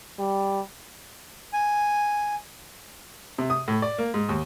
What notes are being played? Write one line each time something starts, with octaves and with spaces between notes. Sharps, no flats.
G3
G#5
C3
D#6
A2
D5
A#3
G#2
D#2